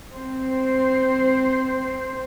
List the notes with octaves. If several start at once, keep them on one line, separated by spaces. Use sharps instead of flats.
C4 C5